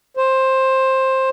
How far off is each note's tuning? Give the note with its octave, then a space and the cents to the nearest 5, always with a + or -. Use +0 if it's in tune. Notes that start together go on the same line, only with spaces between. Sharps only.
C5 +15